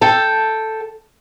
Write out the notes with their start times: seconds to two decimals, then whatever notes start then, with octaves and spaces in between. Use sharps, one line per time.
0.01 A4 G5